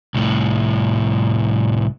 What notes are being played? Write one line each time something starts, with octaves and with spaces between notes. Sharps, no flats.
C2 A2